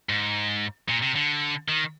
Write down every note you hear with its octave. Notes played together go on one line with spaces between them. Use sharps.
G#2
A#2
C3
D3
D#3